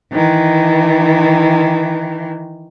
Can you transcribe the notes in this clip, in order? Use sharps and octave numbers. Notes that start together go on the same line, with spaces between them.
D#3 E3